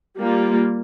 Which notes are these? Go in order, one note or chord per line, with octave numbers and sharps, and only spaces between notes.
G3 A#3 F4